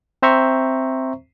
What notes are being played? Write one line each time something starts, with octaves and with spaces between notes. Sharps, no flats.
C4 C5 E5 A#5 C#6